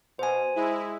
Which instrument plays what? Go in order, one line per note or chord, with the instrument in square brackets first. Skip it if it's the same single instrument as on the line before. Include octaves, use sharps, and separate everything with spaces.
[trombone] B2 [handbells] C5 G#5
[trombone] G#3 [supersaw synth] E4